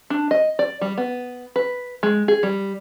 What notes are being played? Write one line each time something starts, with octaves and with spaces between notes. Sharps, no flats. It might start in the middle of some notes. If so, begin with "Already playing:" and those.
D4
D#5
D5
G3
B3
B4
G#3
G#4
G3